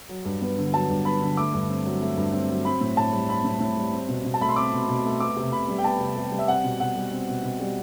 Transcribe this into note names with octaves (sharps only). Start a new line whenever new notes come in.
F#3
G2
B3
D3
F#3 A5
G2
B3 B5
D3
A3 D6
G2
C4
F#3
A3
G2
C4
F#3
C4 B5
A2
A2 A5
G3
C4 B5
A2
A2
G3
C4
B2
B2
A5
A3 B5
C6
C4 D6
B2
B2
A3
B3 D6
C3
C3 B5
G3
G5
B3 A5
C3
C3
G3
E5
C4 F#5
B2
B2 F#5
G3
C4
B2
B2
G3